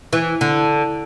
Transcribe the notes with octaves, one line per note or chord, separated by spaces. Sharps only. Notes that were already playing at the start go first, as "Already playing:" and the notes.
E3
D3